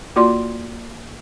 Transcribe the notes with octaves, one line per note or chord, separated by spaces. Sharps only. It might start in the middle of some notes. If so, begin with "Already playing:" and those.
A#3 F4 F#4 D5 C6